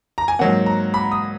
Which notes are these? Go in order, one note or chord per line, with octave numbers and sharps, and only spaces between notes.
A#5
G#5
G#2 F#3 A#3 F#5
A#5
B5
D#6